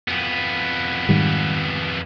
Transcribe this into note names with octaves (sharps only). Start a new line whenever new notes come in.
F2 B3
G#2 D#3 G3